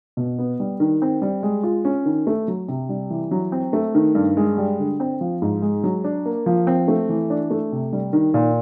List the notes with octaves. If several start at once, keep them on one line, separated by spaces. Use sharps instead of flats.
B2
B3
G3
D#3
C4
G3
G#3
F4
C#4
D#3
A3
F#3
C3
G3
E3
F#3
C4
A3
D#3
G2
G#3
G3
D3
C4
F3
G#2
G#3
F#3
D4
A#3
F3
C4
A3
E3
D4
A3
C3
G3
D#3
A#2